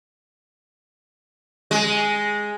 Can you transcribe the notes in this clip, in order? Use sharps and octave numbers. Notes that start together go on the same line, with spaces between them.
G#3